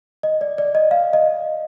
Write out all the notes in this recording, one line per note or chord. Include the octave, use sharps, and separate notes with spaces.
D#5
D5
D5
D#5
F5
D#5